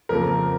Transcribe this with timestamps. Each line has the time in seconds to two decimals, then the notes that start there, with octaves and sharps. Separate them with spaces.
0.09 F2 C#3 F3 A#3 A#4